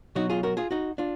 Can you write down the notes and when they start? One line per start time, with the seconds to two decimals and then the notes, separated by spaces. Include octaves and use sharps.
0.15 B2 F#3 D#4 F#4
0.30 F4 G#4
0.43 F#4 A#4
0.57 F4 G#4
0.71 D#4 F#4
0.98 D4 F4